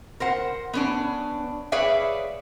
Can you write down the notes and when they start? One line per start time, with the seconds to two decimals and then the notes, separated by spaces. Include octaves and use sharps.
0.20 A#4 C5 F#5
0.73 B3 C#4 D4
1.72 G#4 B4 C#5 D5 E5 F5